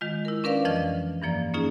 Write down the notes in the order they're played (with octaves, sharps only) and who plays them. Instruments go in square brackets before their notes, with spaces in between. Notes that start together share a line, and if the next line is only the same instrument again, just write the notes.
[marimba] D#3 G#3 F4
E4 A#4
C#4 D4 A#4 B4 D5 F5
F2 E3 F3 D#5 F5 F6
G2 E3 F3 A#3 D5
A#3 C#4 D#4 F4 G#4